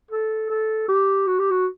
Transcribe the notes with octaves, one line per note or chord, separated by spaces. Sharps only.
A4
A4
G4
F#4
G4
F#4